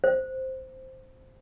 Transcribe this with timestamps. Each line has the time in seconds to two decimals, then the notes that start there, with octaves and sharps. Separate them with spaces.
0.04 C5